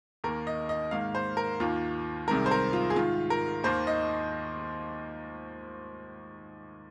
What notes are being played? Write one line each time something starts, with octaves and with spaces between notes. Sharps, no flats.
D#2 D#3 A#3 A#4
D#5
D#5
G#2 D#3 A#3 F5
C5
A#4
D#2 D#3 A#3 F4
C2 C3 D#3 G#3 A#4
C5
A#4
F4
G#4
G#2 D#3 G#3 F4
A#4
D#2 D#3 A#3 C5
D#5